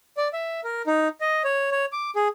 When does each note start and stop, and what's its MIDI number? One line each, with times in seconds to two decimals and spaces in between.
0.17 0.28 74
0.33 0.60 76
0.64 0.82 70
0.87 1.08 63
1.21 1.42 75
1.44 1.70 73
1.71 1.86 73
1.92 2.11 86
2.16 2.28 68